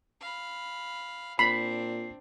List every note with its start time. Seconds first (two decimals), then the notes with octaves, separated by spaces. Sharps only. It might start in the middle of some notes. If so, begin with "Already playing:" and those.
0.20 F5 B5
1.39 A#2 C4 D4 B5 C7